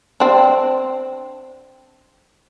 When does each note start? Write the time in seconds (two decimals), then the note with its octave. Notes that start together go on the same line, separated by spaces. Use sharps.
0.20 C4 D4